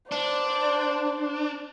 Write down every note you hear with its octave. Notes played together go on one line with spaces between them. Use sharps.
D4 C5 D5